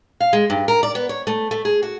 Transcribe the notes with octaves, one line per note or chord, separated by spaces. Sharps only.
F5
G#3
G2
A#4
D5
B3
C#5
A3
A3
G#4
F#4